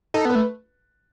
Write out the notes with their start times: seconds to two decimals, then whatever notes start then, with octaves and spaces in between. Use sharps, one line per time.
0.14 D#4 A4
0.25 B3
0.29 B4
0.35 A3